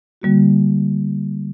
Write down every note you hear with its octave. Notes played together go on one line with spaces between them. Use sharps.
D3 G3 A#3 F#4